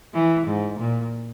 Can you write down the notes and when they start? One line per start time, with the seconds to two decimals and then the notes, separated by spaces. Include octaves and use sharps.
0.14 E3
0.47 G#2
0.80 A#2